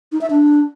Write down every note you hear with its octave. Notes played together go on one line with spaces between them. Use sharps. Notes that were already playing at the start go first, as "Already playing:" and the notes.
D#4
E5
D4